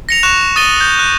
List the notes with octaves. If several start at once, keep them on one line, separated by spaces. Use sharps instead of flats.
A#6 C#7 F7
C#6 F#6 E7
D#6 A6 D#7 G7
G6
F#6